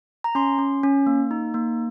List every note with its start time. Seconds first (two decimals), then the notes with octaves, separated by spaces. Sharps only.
0.24 A#5
0.35 C#4 C6
0.59 C#4
0.83 C#4
1.07 A#3
1.31 D#4
1.54 A#3